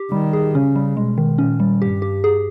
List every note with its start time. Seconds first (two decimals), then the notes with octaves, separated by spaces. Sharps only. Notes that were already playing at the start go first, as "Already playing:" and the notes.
Already playing: G4
0.12 D#3 G3
0.33 G#4
0.55 C#3 C#4
0.76 G3
0.97 B2 G#3
1.18 D#3
1.38 A#2 C#4
1.60 G3
1.81 G2 G4
2.02 G4
2.24 G#4